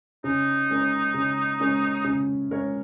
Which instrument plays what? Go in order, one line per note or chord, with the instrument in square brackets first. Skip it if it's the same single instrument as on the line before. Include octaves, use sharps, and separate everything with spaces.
[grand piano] C#3 [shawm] D#4
[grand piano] G#3 C#4 A#4 C#5
C#3
G#3 C#4 A#4 C#5
C#3
G#3 C#4 A#4 C#5